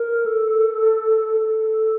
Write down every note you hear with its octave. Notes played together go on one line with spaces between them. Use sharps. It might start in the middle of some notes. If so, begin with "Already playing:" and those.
Already playing: A#4
A4
A4